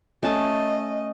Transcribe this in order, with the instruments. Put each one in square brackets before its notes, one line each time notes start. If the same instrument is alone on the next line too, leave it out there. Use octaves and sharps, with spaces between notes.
[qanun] A3 C#4 A5 [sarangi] D#5